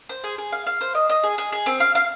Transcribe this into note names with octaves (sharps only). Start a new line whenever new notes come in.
C5
G#4
G#4
F5
F5
C5
D#5
D#5
G#4
G#4
G#4
C4
F5
F5